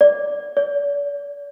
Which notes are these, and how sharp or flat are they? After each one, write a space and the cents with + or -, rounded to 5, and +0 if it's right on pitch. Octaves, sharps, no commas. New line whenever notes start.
D5 -5
D5 -40